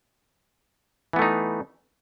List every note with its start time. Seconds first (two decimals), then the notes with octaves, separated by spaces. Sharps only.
1.13 E3
1.16 B3
1.19 A3
1.22 D#4